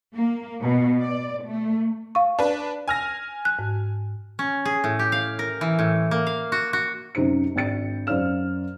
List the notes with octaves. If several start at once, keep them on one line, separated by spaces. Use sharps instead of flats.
A#3
B2
D5
A3
F5 C#6
D4 B4
G#5 F6 A#6
F#6
G#2
C#4
G#4
A2
G4
F5
A#4
E3
A2
A#3
F5
F#4
F#4
F#2 C3 D#4 C5 C#7
G#1 D4 G5 A6 C#7
F#2 C5 D5 F5 F6 E7